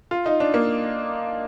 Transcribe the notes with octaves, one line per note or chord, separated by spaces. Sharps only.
F4
D#4
D4
A#3